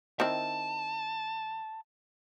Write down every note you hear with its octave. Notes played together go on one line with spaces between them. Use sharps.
D#3 C4 E4 A5